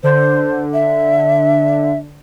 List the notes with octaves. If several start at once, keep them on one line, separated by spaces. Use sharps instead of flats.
D3 C5
E5